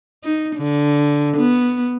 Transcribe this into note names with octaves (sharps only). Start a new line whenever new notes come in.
D#4
D3
B3